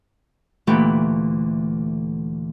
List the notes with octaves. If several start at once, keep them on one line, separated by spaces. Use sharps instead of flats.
D2 A#2 E3 A3 G4 B4